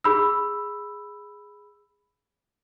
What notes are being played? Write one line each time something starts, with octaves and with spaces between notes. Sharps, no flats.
G#4 B5 E6